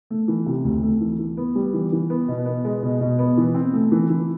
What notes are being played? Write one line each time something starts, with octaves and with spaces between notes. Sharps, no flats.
A3
E3
C3
D2
A3
E3
E3
B3
G3
E3
E3
B3
B2
B3
G#3
B2
B2
B3
E3
C4
A3
E3
E3